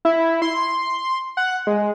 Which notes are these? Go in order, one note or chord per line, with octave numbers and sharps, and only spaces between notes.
E4
C6
F#5
G#3